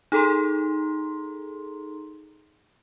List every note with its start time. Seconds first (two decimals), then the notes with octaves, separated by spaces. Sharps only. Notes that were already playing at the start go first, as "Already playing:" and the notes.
0.12 D#4 G#4 A4 A#5 C6